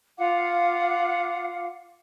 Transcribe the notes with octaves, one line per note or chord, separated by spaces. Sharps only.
F4 F5 F#5 D6